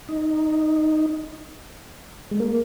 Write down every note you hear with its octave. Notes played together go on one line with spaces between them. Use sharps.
D#4
G#3
A#3